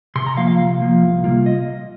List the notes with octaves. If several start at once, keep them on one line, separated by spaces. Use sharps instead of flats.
C3 C6
A#5
F3 A#3 F4 F5
F5
C3
F3 A#3 F4
C2
C3 G3 A#3 F4
D#5